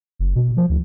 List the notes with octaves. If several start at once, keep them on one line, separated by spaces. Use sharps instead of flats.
F#1
B2
F3
D2